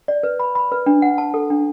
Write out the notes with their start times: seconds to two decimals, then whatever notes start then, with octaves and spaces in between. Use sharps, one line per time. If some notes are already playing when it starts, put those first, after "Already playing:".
0.08 D5
0.23 B4
0.40 B5
0.55 B5
0.72 B4
0.86 D4
1.02 F#5
1.18 A5
1.34 A4
1.50 D4